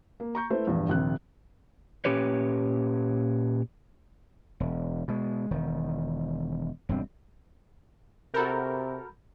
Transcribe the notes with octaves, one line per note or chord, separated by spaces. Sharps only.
A#3
A#5 C#6 G6
A3 E4 B4 C5
A#1 E2 G2
A#1 D#2 C3 F#6
A#2 C#4 G4 B4 C#5
E1
B2 G#3
E1 D#3
E1 G2 C4
C3 F#4 A4 A#4 A#5 B5 G6